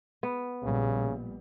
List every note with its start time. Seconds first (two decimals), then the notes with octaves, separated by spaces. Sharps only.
0.23 B3
0.63 A#1 A#2 C#3 G3